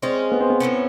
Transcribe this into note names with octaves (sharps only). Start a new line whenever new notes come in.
G#3 C4 C#4 F4 G#4
B3
C4
B3
A2 E3 A3 C#4